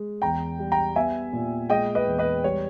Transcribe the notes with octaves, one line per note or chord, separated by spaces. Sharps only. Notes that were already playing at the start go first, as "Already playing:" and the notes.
Already playing: G#3
E2 G5 A#5
G3
G5 A#5
B3 E5 G#5
A#2
G#3 D#5 G5
B4 D#5
E2
B4 D#5
G3 C#5